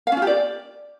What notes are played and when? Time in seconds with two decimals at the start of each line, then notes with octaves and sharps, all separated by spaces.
0.07 F5
0.12 C#4
0.17 F4
0.22 G4
0.27 D5